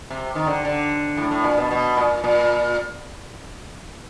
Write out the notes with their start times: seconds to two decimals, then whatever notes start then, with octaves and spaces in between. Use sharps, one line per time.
0.10 C3
0.35 D#3
0.46 D3
0.65 D3
1.17 A2
1.31 A2
1.44 A#2
1.57 B2
1.71 B2
1.97 A#2
2.24 A#2